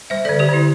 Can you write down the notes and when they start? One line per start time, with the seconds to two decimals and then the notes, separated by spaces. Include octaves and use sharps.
0.10 G3 C5 E5
0.25 A4 D5
0.29 D3
0.39 G4 C5
0.49 D3 E4